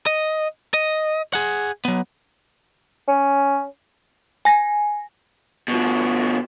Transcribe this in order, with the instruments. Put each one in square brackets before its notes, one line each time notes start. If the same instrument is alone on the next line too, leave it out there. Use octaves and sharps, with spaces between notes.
[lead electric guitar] D#5
D#5
G#4 F#5
F#3 B3
[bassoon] C#4
[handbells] G#5 A#6
[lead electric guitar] B2 F3